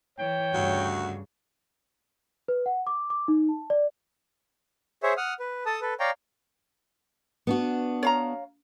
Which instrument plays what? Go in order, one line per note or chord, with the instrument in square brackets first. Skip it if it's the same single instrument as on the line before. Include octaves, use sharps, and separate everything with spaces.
[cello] E3 [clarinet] C#5 [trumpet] G5
[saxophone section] D2 F#4 [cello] G2 C#3
[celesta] B4
F#5
D6
D6
D#4
A5
D5
[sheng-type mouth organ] G#4 C5 C#5 E5
F#5 D#6 F6
B4
A4 A5 D#6
A4 B4
C#5 D5 F5 G5 A#5
[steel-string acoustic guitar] B3 D4 F#4
[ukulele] C#5 F5 A#5